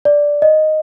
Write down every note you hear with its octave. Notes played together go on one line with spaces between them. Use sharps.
D5
D#5